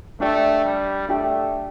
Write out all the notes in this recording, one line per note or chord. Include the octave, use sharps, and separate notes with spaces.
A3 D4 G4 D5 G5
G3
A3 D4 G4 D5 G5